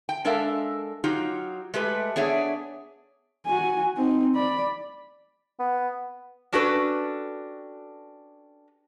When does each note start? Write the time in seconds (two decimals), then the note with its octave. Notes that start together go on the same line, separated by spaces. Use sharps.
0.09 G5
0.25 G#3 D4 A4 A#4 E5 F5
1.04 F#3 D#4 F4 G4
1.74 G#3 A3 G4 B4
2.16 B3 D4 G#4 C#5 E5
3.46 F#4 G#5
3.96 C4 D#4
4.36 D5 B5
5.59 B3
6.52 C#4 D4 F#4 G4 A4 B4